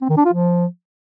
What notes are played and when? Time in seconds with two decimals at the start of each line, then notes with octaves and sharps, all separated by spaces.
0.02 C4
0.09 D#3
0.17 D4
0.25 F4
0.33 F3